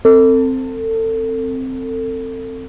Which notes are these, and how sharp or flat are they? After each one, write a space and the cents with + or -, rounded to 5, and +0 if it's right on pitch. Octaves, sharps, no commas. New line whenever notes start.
C4 +0 A4 +30